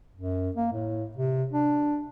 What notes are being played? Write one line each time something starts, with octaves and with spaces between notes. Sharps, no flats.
F#2
A#3
A2
C3
D4